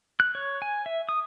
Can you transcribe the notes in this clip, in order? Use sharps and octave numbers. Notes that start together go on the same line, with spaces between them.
F#6
C#5
G#5
E5
D#6